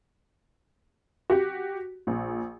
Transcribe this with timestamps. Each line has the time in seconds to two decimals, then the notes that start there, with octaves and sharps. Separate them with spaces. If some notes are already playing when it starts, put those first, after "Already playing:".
1.30 F#4 G4
2.07 A#1